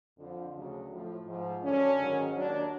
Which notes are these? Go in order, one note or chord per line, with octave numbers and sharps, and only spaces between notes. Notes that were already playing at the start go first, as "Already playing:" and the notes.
F2 D3 F3
D2 C#3 F#3
A2 F3
G#2 F3
F#2 D3 F#3 C#4
G#2 D#3 F#3
D#2 D#3 F#3 D4